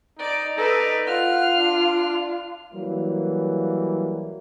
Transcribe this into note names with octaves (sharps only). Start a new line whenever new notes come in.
D#4 D5
D#4 A4 B4 D5
F4 F#5 F6
D4
E3 F#3 G3 A#3